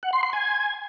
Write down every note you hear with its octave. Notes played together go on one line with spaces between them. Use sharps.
F#5
C6
C6
G#5